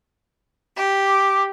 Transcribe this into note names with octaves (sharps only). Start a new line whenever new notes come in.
G4
D6